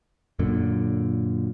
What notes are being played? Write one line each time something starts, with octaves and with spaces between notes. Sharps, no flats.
F#2 A#2 D3